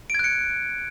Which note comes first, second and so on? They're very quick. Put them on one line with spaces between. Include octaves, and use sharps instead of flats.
D7 G#6 F#6 C#7